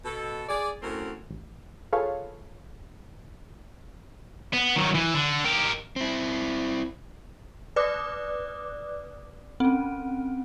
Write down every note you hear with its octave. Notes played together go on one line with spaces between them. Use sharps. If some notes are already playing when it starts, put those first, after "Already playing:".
B2 A4
G#4 D5
F#2 A2 C4 F#4 A#4
A1
F4 G#4 A4 B4 C#5 F5
B3
D#3 F#3
E3
D3
G4 A#4
C4 E4
B4 D5 D6 D#6 F#6
C4 C#4